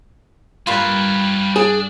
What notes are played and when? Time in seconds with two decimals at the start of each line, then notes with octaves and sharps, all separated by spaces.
0.67 G2 G3 A#3 F4 B4 C#5
1.56 D4 G#4